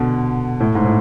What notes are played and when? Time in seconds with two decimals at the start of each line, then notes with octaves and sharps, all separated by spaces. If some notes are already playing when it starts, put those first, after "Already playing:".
Already playing: B2 D3
0.60 A2
0.75 G#2
0.85 A2